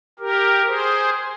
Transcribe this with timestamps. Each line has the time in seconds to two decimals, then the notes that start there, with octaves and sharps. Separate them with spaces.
0.19 G4 A#4
0.67 G#4 C5